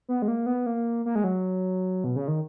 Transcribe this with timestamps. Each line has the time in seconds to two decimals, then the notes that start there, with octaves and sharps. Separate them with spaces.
0.09 B3
0.22 G#3
0.28 A#3
0.46 B3
0.66 A#3
1.06 A#3
1.15 G#3
1.24 F#3
2.04 B2
2.16 C#3
2.28 D#3